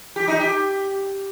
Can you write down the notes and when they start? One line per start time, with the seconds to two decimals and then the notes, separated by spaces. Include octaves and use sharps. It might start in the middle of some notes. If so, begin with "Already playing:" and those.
0.16 G4
0.28 D#4
0.39 G4